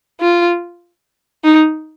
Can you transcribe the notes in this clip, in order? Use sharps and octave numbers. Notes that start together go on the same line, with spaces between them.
F4
D#4